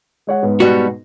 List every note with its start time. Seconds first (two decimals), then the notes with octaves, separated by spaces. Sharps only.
0.27 G#3 C#5 F#5
0.43 G#2 B3
0.60 B2 G3 F#4